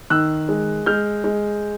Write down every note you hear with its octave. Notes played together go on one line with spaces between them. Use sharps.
D#3 E6 F#6
G#3
G#3 F6 G6
G#3